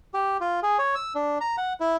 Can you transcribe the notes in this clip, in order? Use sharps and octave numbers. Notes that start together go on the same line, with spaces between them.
G4
F4
G#4
C#5
E6
D4
A#5
F#5
E4